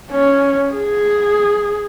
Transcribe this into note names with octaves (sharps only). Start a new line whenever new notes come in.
C#4
G#4